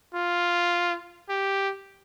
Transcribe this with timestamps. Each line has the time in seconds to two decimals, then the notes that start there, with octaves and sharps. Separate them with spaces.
0.14 F4
1.29 G4